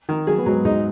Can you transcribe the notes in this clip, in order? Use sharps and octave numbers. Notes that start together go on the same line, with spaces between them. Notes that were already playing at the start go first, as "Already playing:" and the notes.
D#3
F#3 G#4
B3
G#2 F#3 G#3
G#2 G#3 D#4